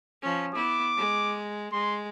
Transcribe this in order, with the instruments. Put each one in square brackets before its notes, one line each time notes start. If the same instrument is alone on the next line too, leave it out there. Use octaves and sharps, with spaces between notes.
[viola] F3 C#4
[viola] B3 E4 [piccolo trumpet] D6
[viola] G#3
[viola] G#3 [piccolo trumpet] C6